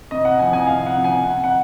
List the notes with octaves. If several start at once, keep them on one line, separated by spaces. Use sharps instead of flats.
C3 D#5
F#5
F3 C4 G#5
G#5
C3 F5
F#5
F3 C4
G#5
C3 F#5
F#5